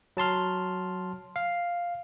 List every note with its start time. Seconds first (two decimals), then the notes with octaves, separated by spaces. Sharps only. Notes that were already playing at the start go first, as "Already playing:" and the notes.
0.17 F#3 A5 C6 F6
1.36 F5